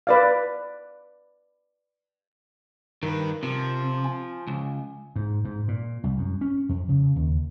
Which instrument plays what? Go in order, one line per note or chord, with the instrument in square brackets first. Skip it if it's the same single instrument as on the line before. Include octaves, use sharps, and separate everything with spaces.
[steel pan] B4 D5 F5
[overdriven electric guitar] G2 B4 [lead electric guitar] D#3 [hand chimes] A#4
[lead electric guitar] C3 [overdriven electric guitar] F3
[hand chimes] G#5
[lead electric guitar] C#2
[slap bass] G#2
G#2
A#2
C2
F#2
C#4
F2
C#3
D#2